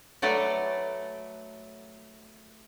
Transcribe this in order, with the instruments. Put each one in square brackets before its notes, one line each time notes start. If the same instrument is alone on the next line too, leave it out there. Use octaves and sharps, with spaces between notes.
[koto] F#3 A3 A4 B4 D5